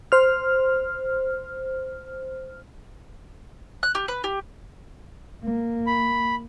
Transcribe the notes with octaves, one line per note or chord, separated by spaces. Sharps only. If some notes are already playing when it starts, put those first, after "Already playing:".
C5 F6
F#6
G4
B4
G4
A#3
B5